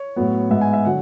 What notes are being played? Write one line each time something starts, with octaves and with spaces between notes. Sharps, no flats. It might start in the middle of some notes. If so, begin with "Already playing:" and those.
Already playing: C#5
A2 F#3 B3
G#2 G#3 B3 E5
G#5
E5
D3 F#3 F#5